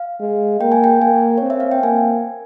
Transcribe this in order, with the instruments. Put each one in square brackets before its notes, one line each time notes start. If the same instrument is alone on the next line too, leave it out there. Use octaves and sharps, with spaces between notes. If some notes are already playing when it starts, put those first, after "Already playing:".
Already playing: [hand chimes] F5
[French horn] G#3
[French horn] A#3 [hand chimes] G5
[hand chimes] G#5
G5
[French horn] A#3 [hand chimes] G#5
[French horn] C4 [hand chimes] C#5
[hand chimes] E5
F5
G5
[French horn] A#3 [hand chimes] G#5